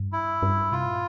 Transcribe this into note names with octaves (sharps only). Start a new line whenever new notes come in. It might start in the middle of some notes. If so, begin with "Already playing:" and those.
Already playing: G2
E4
G2
C3 F4
A#2